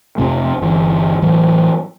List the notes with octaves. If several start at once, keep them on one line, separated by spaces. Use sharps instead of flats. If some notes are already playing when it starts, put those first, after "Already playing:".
F2 C3 A3
G1 E3
A2 E3 F#3